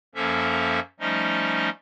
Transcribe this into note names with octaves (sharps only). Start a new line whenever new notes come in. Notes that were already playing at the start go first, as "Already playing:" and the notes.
F#2 F3 A#3 C#4 A4 E5
F3 G3 A3 C#4 D#4 D#5